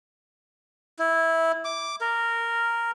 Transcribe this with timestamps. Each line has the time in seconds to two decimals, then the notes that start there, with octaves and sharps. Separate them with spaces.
0.99 E4
1.65 D6
2.01 A#4